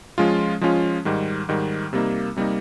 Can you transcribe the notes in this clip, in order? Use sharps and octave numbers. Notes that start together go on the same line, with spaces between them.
F3 G#3 C#4 F4
F3 G#3 C#4 F4
G#2 D#3 G3
G#2 D#3 G3
C3 G3 A#3 D#4
C3 G3 A#3 D#4